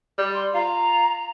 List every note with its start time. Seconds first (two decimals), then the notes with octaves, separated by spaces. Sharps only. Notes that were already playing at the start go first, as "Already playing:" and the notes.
0.18 G3
0.33 C6
0.54 F4 A#5